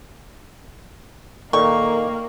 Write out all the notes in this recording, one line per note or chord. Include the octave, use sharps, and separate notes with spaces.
A#2 D#3 A#3 A4 D5 C#6